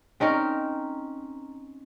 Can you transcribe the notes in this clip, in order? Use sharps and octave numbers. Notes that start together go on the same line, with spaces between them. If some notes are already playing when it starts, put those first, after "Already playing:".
C4 C#4 D#4 A#4